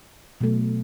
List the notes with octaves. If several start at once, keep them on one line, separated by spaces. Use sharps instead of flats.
B2 F#3 A3